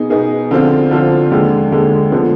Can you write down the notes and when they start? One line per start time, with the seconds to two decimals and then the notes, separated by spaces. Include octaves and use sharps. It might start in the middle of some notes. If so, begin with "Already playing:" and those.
Already playing: B2 B3 D#4 G#4
0.10 B2 B3 D#4 G#4
0.51 D3 F3 C4 F4
0.91 D3 F3 C4 F4
1.31 D#2 D3 G#3
1.72 D#2 D3 G#3
2.12 D3 F3 G#3 B3